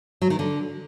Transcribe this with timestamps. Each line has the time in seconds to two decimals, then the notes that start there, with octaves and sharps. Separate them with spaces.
0.22 F#3
0.30 D#3
0.39 D3